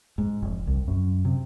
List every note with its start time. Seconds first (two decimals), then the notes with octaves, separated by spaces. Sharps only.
0.18 G#2
0.42 F1
0.67 C2
0.88 F#2
1.25 C3